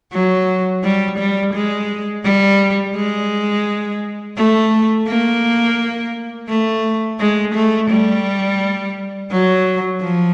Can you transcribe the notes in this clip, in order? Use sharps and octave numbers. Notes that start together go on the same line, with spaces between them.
F#3
G3
G3
G#3
G3
G#3
A3
A#3
A3
G#3
A3
G3
F#3
F3